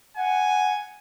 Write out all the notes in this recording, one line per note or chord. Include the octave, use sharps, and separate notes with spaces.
F#5 G#5